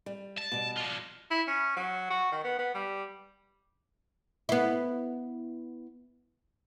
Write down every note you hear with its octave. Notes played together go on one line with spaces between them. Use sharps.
G3
A5
B2 G3
D4 F4
E4
C#4
F#3
F#4
D#3
B3
B3
G3
B3 E4